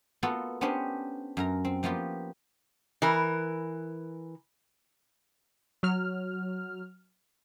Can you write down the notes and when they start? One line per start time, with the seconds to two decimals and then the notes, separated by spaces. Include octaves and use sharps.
0.23 A#3 B3 F4 F#4 A4
0.61 B3 C#4 D4 G4 C5
1.37 F#2 A#4 A#5
1.65 C4
1.83 F3 A#3 B3 F4 G4
3.02 E3 A#4
5.83 F#3 F6